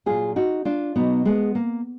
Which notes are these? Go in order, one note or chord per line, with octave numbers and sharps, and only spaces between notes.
A#2 F#3 F4 G#4
D#4 F#4
D4 F4
B2 F#3 B3 D#4
G#3 B3
A#3